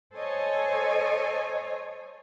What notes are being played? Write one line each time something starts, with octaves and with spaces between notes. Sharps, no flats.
A4 C5 C#5 D#5 G#5